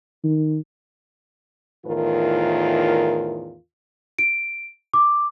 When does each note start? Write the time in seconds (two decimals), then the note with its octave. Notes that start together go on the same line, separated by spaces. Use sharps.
0.24 D#3
1.85 E2 A2 D#3 F4 A#4
4.19 D7
4.94 D6